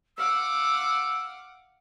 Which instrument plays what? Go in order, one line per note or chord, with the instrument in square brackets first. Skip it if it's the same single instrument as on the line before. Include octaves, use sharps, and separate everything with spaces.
[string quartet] F5 F#5 D6 [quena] E6